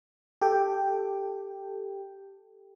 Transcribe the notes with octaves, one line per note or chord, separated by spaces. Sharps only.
G4 A4 G5